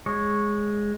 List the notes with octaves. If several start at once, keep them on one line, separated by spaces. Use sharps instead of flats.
G#3 C#5